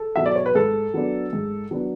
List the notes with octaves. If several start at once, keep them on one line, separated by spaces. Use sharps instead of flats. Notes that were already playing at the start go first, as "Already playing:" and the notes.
Already playing: A4
B2 F#3 E5
D5
C#5
B4
G#2 A4
F#3 B3 D4
G#2
F#3 B3 D4